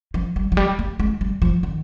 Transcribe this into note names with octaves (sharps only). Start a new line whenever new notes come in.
F3
G3
F3
G3
A#3
G#3
G3
F3
D#3